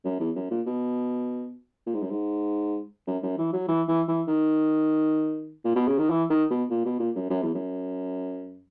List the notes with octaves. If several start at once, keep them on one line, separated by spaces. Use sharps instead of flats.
F#2
E2
F#2
A#2
B2
A#2
G#2
F#2
G#2
F#2
F#2
E3
F#3
E3
E3
E3
D#3
A#2
B2
C#3
D#3
E3
D#3
B2
A#2
B2
A#2
F#2
F#2
E2
F#2